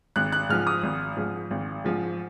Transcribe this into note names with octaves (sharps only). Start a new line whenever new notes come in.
G#1 F#6
F#6
G#2 F3 F6
D#6
G#1
G#2 F3
G#1
G#2 F3